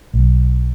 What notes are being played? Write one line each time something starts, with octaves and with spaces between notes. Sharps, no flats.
B1